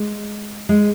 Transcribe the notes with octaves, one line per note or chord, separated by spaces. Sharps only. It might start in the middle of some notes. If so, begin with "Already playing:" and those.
Already playing: G#3
G#3